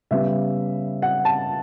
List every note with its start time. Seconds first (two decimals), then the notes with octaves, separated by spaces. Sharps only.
0.11 C#3 G3 B3 E5
1.02 F#5
1.25 A5